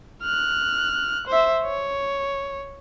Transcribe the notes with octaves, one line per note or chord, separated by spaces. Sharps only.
F6 F#6
C5 E5
C#5